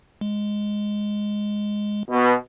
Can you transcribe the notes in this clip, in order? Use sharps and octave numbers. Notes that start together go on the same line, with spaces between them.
G#3
B2